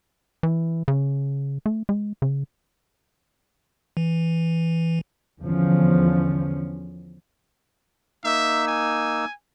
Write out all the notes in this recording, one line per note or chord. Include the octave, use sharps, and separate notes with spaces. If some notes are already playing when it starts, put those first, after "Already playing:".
E3
C#3
A3
G#3
C#3
E3
E2 D3 F3 C#4
A#3 D#4 E5 E6
G#5